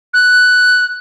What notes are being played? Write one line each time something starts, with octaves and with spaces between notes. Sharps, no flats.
F#6